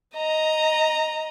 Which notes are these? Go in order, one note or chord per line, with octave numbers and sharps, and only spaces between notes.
D#5 A#5